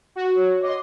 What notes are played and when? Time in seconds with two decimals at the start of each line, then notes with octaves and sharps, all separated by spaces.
0.16 F#4
0.36 C#5
0.63 D#5 C6 D6